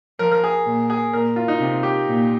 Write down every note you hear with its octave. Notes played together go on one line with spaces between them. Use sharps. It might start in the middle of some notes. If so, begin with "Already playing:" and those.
F3 A#4
A#4
G#4
A#2
G#4
A#2 A#4
F4
D#4
C3
G4
A#2